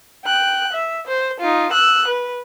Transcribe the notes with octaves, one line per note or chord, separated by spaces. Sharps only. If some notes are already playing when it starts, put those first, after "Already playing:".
G5 F#6
E5
C5
D#4 F4
E6 F#6
B4